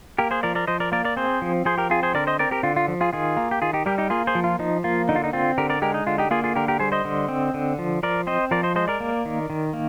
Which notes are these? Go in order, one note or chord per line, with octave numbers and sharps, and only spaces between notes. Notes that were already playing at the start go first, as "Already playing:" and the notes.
A#3 G4 A#4
G#4 C5
F3 A#4 D5
A#4 D5
F3 C5 D#5
A#4 D5
A#3 A#4 D5
A#4 D5
C4 G#4 C5
F3
F3 G#4 C5
G4 A#4
C4 F4 G#4
G#4 C5
D3 A#4 D5
C5 D#5
C4 A#4 D5
G4 A#4
D3 F4
F4
F3
F4 G#4
D#3 F4 G#4
A#3
G4
D#3 F4 G#4
D#4 G4
G3 G4 A#4
D#4 G4
A#3 F4 G#4
G#4 C5
F3
F4
F3 D#4
A#3 F4
D3 D#4
F4
D#4
C4 F4
D3 G4 A#4
A#4 D5
G#3 G4 A#4
D#4
D3 F4
D#4 G4
A#3 F4 G#4
F4 G#4
D3 G4 A#4
G4 A#4
G3 G#4 C5
C5 D#5
D3
C4
D3
F3
F3 A#4 D5
C4 C5 D#5
F3 A#4 D5
C5 D#5
G#3 C5 D#5
A#4 D5
A#3
D#3
D#3
A#3